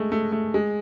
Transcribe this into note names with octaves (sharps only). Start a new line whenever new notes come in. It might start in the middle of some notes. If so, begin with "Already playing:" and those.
Already playing: G#3 A3
A3
A3
G#3